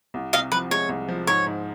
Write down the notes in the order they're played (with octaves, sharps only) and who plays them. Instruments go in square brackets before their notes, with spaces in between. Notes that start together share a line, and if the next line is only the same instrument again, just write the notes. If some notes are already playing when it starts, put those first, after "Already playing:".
[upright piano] C2
[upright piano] C3 [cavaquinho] D#5 F5
[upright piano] F3 [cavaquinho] B4
[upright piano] G#3 [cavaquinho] C#5
[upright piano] C2
F3
[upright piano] G#2 [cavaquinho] C#5
[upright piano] G#2